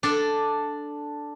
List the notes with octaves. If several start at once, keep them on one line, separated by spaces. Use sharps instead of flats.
D4 A4